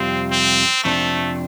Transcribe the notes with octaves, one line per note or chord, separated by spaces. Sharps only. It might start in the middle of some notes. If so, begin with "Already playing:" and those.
Already playing: F2 C3 G3 C4 F4
C4
F2 C3 F3 A3 D4